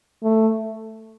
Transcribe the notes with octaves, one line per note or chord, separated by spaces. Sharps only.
A3